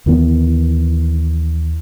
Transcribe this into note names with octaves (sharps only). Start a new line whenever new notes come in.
D#2 D#3 E3 B3